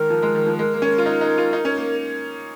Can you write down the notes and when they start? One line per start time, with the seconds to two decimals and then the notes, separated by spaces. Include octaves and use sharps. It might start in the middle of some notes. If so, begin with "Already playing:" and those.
Already playing: D#3 G#3 A#4
0.10 F3
0.23 G#3
0.35 D#3
0.47 F3
0.58 G#3 A#4
0.74 A#3
0.82 C#4
0.98 F4
1.06 D#4
1.21 D#4
1.38 F4
1.53 D#4
1.65 C#4
1.77 A#3